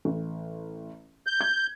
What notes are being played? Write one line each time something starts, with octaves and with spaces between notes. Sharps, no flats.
A1
G6
G#6